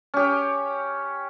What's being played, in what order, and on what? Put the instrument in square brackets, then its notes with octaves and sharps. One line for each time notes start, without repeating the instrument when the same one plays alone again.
[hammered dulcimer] C#4 G4